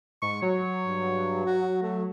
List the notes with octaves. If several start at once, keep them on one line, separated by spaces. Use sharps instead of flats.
G#2 C#6
F#3 C#5
G2
F#4
A3